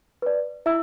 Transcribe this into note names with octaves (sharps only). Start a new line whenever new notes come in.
B4 D5
E4 E5 E6